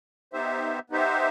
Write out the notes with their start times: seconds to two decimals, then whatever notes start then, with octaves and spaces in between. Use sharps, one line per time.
0.33 B3 D#4 G4 C5 E5
0.90 B3 D#4 G4 C5 E5